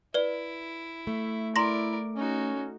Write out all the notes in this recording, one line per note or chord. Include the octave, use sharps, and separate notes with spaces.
E4 B4 D5
A3
E4 A#4 D5 A#5 C6 A#6
C#4 D#4 F#4